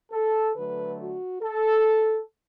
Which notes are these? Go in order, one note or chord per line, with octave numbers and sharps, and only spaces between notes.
A4
D3 F#3 A3 B4
F#4
A4